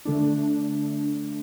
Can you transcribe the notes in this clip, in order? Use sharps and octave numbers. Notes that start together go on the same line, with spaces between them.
D3 A3 D4